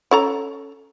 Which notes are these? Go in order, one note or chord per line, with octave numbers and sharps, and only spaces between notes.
C#4 A4 A#5